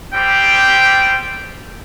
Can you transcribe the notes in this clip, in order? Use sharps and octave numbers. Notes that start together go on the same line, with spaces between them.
G3 C4 G4 G5